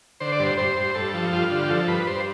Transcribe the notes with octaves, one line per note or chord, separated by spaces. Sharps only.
D3 C5
D5
G2 C5
G2 C5
G2
G2 A4
F3
G2 F4
D3
G4
F3 A4
G2 B4
G2 C5